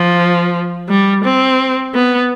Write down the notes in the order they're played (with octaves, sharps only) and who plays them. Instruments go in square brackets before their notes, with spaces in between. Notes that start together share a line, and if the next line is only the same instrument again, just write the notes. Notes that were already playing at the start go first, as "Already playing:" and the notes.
Already playing: [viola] F3
G3
C4
B3